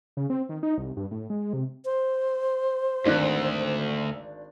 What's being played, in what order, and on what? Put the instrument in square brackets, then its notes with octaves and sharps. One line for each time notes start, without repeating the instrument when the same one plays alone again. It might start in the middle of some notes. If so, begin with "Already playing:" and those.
[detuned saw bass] C#3
C4
D#3
D#4
C2
G2
A2
G#3
C3
[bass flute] C5
[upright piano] G#1 D4 F#6 [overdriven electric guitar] D2